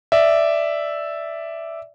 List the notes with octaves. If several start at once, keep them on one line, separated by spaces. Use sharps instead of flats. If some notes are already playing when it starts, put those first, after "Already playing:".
D5 E5